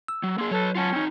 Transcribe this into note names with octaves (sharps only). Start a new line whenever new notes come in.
E6
F#3
A#3 G#4 C6
F#3 A4 B4 C#5
C#4 F4 F#5 A5
C4 D#4